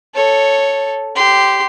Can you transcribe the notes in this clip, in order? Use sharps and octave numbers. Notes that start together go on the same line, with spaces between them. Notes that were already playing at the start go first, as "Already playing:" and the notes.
A4 C#5
G4 C6